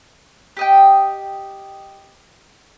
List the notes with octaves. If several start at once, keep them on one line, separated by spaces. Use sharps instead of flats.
G4 D#5 G5